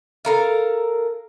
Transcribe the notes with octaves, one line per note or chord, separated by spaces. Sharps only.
A4 A#4 F5